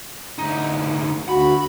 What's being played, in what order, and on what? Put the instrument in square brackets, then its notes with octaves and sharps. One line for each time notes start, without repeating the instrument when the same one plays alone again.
[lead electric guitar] D2 D#4
[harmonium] D2 F#4 [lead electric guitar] B5